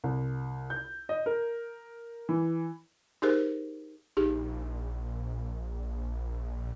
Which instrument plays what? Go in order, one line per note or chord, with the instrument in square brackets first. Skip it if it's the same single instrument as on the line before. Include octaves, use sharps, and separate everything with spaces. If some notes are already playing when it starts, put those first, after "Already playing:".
[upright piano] C2
G6
D#5
A#4
E3
[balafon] D#4 G4 G#4 A#4 C5
[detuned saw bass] A#1 [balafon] D#4 G4 G#4